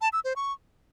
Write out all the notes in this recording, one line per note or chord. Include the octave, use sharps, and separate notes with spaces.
A5
E6
C5
C#6